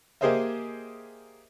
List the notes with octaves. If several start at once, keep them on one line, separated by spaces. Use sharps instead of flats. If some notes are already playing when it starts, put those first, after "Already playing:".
A#3 G4 G#4 C5 D#5 E5